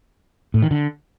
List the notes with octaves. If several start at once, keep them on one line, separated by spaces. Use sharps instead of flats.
A2
D#3
D3